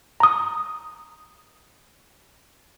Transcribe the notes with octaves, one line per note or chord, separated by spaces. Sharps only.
A#5 D#6